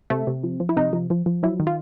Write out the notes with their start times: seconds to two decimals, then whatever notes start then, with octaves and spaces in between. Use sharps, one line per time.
0.10 C3 A3
0.27 C3
0.43 F3
0.60 F3
0.69 E4
0.77 C3 D#4
0.93 F3
1.10 F3
1.26 F3
1.43 F#3 E4
1.60 D#3
1.67 F4